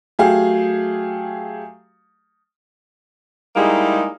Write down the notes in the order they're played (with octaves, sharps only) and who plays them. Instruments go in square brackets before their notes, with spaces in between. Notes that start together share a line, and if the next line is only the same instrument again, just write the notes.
[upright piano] F#3 A3 G4 G#4 F5
[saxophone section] G3 G#3 A#3 D#4 E4 G#4